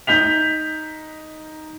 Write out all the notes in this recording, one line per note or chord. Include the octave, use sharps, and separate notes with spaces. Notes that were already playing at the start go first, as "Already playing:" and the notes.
D#4 G6 B6 F7